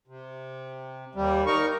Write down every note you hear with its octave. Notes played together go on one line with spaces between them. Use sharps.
C3
D#2 G3
D#4 A#4 C#6